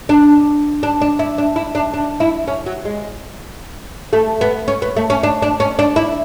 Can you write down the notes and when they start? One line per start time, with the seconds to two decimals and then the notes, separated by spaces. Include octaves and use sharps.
0.09 D4
0.83 D4
1.01 D4
1.19 E4
1.38 D4
1.56 E4
1.75 D4
1.94 D4
2.20 E4
2.48 C#4
2.66 F#3
2.85 G#3
4.13 A3
4.41 B3
4.68 C#4
4.82 B3
4.96 A3
5.10 C#4
5.23 D4
5.42 D4
5.60 C#4
5.79 D4
5.96 E4